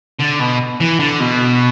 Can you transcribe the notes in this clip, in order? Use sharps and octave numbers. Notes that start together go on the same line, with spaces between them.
D3
B2
E3
D3
B2